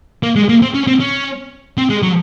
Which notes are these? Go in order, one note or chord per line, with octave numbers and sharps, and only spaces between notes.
A#3
G#3
A#3
C4
C#4
C4
C#4
C4
G#3
F#3